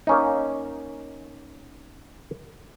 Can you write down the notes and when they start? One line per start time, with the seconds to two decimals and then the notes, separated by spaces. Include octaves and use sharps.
0.07 A#3 C#4 D#4